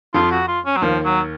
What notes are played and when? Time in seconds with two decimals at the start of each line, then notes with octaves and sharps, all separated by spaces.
0.14 F2 F3 F4
0.32 F#4
0.48 F4
0.66 C#4
0.77 F#3
0.82 D#2 D#3 F3
1.05 F#3